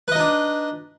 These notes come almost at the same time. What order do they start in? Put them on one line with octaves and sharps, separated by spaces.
B4 D#5 D#4 D4